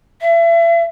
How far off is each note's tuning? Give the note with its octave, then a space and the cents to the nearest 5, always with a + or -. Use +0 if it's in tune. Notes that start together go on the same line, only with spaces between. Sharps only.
E5 +35